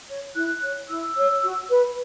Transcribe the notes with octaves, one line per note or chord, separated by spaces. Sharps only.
C#5
E4 F#6
C#5
E4 E6
C#5
F#4
B4